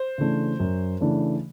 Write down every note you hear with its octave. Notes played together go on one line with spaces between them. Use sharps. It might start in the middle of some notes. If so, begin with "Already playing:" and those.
Already playing: C5
C#3 E3 A3 D4
F#2
C#3 E3 A3 D4